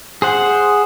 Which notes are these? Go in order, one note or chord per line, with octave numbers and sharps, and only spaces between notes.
G#4 C5 F#5